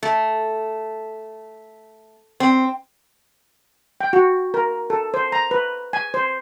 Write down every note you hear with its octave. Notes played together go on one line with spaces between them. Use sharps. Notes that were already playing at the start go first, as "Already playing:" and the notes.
A3
C4
G5
F#4
A#4
A4
C5
A#5
B4
G#5
C5